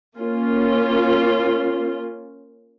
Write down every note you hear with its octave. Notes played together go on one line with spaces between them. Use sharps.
A#3 C#4 F4